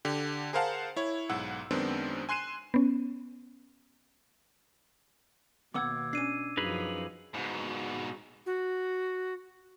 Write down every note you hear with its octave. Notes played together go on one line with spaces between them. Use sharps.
D3 G4
G#4 A#4 C5 F5 F#5 A5
E4 C#5
B1 G#2 F#5 E6
F#2 D#3 G#3 B3 C4 D4
G#5 C6 F#6 C7 D#7 E7
B3 C#4
D#2 B2 B3 F#5 D6 E6 G#6
C#4 D4 C7 D#7
F#2 F3 D#4 G#4 B4
G#2 B2
F#4